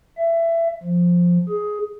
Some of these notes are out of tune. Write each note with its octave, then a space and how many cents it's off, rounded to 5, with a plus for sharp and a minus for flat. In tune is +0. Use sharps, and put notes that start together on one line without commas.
E5 +20
F3 +5
G#4 +10